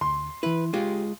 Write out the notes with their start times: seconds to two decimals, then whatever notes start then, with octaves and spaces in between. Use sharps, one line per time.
0.01 D2 C6
0.43 E3 E4 B4
0.74 G#3 F4 G4